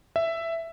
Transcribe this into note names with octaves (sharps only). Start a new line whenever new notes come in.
E5